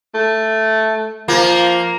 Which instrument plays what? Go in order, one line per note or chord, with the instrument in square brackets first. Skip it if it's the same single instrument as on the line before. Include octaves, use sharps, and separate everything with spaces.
[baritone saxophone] A3
[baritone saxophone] F3 [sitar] A#3